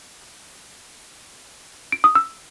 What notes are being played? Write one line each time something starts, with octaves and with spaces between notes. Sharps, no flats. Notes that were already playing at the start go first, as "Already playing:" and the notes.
D7
D#6
E6